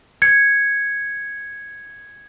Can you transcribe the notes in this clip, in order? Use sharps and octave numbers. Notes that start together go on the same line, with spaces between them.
G#6 C#7